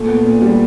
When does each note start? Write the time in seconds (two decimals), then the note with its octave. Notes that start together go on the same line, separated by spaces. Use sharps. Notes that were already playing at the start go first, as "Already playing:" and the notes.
Already playing: A#2 A3
0.08 B3
0.25 A#2
0.42 G3